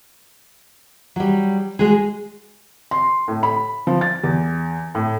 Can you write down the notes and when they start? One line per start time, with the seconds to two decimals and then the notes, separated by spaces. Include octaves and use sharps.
1.16 F#3 G3
1.79 G#3 F#4 G#4
2.91 C6
3.28 A2
3.43 B5
3.87 F3
4.01 A6
4.24 E2
4.95 A2